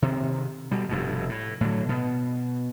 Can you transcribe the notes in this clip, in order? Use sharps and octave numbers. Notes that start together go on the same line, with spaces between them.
C3 D#3 C4
B2 G3
F1 G2 B2
A2
A2 D3 F#3
B2 B3